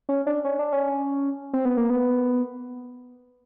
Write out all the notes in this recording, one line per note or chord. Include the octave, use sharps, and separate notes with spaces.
C#4
D4
C#4
D4
C#4
C4
B3
A#3
B3